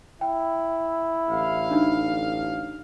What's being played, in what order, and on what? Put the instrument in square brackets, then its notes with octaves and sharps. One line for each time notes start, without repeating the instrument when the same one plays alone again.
[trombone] E4 [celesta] G5
[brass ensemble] A1 D3 F5
[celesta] D4 D#4